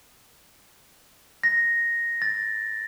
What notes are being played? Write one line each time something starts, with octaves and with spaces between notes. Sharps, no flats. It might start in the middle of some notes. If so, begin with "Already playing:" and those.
A#6
A6